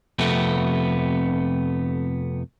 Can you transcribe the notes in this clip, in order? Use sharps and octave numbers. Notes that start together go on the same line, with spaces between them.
F2 C3 A3 B3